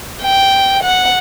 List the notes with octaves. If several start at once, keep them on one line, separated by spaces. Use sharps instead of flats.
G5
F#5